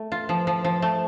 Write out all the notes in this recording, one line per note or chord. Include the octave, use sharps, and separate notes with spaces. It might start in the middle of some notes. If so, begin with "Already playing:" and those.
Already playing: A3
F4
F3
F3
F3
A3